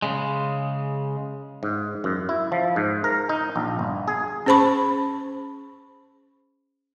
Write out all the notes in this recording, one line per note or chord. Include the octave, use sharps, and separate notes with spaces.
C#3 G#3
G#2
F#2
E4
F3
G#2
A#4
D#4
A#1
G1
G#4
C#4 G#4 C5 A5 B5 C#6